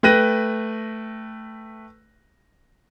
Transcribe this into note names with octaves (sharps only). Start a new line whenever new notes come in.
A3 B4 G5 F#6 A#6 D#7